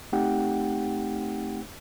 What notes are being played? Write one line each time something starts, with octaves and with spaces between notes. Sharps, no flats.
A3 C4 D#4 G4 F#5 G5